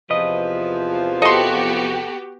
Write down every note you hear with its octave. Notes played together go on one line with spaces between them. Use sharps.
E2 C3 F3 B4 D#5
B3 F#4 G4 A4 D#5 C6